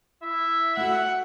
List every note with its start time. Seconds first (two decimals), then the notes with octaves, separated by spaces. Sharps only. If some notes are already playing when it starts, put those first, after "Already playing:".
0.23 E4 E5
0.77 A3 F#4 F#5